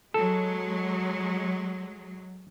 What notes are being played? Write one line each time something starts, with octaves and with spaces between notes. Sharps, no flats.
F#3 G#3 A4